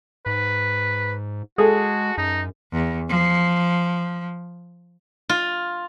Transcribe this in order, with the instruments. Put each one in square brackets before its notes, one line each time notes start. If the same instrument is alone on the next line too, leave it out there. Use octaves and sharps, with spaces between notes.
[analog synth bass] G#2 [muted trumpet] B4
[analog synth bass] G#3 [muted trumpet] F#4 [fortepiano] G#4 [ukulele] A4
[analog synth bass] F#2 [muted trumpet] D#4
[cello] E2
F3
[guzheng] F4